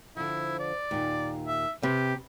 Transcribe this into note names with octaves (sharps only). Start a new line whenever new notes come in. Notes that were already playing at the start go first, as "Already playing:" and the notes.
D3 F3 E4
D5
D#2 A#2
E5
C3 G4 B4